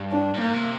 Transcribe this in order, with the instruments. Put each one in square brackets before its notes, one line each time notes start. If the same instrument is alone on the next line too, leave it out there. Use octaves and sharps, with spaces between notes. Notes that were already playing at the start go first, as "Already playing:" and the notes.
Already playing: [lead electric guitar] G2
[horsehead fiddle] D4
[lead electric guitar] G2
[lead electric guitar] G#2 [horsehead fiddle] A#3
[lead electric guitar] C3